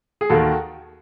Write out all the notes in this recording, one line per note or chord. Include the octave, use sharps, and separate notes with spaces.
G#4
D#2 D#3 F#4 A4